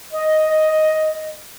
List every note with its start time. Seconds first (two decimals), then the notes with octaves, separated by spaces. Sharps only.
0.13 D#5